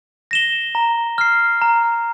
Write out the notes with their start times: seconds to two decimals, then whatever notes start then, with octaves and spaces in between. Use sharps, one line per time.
0.31 A#6 E7 G7
0.75 A#5
1.18 F6 C7
1.62 A#5